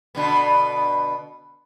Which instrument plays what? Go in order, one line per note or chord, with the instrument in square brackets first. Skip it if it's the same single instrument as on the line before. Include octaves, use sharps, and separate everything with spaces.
[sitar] B2 D3 B3